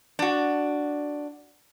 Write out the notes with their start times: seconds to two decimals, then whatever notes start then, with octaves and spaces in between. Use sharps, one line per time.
0.19 D4 F#4